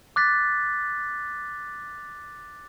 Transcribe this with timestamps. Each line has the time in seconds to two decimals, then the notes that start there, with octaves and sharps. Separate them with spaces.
0.16 D6 F#6 A6 B6